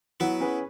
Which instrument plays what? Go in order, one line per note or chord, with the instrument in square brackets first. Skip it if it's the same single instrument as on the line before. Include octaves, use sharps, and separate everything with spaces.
[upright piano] F#3 [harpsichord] B3 E4
[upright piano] C#4 G#4 B4